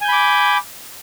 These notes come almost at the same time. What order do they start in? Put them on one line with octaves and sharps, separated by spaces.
G#5 G6 B5 D6